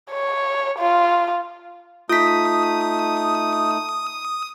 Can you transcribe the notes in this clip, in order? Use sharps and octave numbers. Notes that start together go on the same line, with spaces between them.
C#5
F4
A3 D#4 F4 D#6 B6